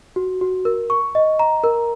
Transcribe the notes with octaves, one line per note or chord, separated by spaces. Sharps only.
F#4
F#4
A#4
C#6
D#5
A#5
A#4